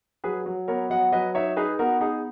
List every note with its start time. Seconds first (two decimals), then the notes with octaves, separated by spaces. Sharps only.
0.24 F#3 G#4 B4
0.46 F#3
0.68 B3 A#4 C#5
0.90 F#3 D#5 F#5
1.12 F#3 B4 D#5
1.35 D#4 C#5 E5
1.57 D#4 G#4 B4
1.79 B3 F#4 A#4
2.01 D#4 G#4